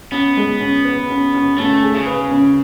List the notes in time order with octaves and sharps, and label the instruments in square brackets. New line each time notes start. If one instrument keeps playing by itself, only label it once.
[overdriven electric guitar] B3 [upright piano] C#4
[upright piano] G#3
C#4
B4
C#4
C#4
[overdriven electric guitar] A3 [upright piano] C#4
[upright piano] G#4
[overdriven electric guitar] C#3
[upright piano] B4
C#4